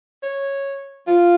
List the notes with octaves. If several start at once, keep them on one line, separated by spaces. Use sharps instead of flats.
C#5
F4